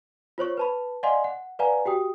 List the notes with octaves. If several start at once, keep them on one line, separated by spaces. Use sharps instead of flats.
F4 C5 C#5 C#6
B4 A5 B5
D5 D#5 F5 F#5 G#5 C6
F#5
B4 D5 F5 F#5 G#5 A#5
F#4 G4 G5 D#6